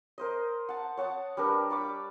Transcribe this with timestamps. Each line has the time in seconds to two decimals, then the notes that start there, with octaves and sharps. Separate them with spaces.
0.18 A#4 C5 D#5
0.69 F#5 A5
0.97 C#5 F#5 A5 D#6
1.37 G3 D4 A#4 B4
1.70 D5 B5 C#6 D6